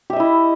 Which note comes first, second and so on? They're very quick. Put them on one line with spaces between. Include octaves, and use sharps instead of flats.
G4 E5 D#5 E4